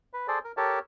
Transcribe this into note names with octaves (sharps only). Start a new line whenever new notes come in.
B4
G#4 A4 C5 D5
A#4
G4 A4 A#4 C#5 A5